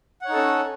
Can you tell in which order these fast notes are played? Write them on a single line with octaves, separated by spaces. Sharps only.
F#5 C#5 D#4 A4 C#4